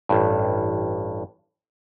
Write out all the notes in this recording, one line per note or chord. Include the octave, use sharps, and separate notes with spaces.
A1 G2